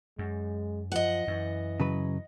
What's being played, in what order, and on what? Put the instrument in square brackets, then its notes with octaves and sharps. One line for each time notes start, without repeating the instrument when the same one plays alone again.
[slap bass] F#2 [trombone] G#3
[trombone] F3 [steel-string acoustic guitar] D#5 F#5
[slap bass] F#2 [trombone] E3
[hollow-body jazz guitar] C#3 F#3 B4